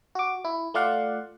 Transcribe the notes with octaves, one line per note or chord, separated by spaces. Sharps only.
F#4 D6
E4
A3 F4 D5 F5 F#5